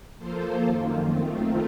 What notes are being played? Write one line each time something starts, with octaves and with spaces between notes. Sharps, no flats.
F3 A#3 F4 A4 C5
F#2 D#3 A#3
D#3 A3 C4 F4